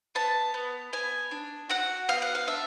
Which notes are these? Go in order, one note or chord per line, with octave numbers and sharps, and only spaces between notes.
B3 A5
B3
B3 G#5
D4
F#4 F#5
B3 F5
F#5
F5
D4 E5